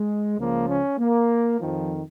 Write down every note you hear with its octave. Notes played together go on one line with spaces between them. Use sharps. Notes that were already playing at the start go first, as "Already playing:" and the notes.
Already playing: G#3
C#2 C#3 F3 A#3
C#4
A#3
F2 D#3 F3